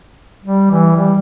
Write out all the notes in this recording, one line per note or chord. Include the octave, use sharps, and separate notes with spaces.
G3
E3
G3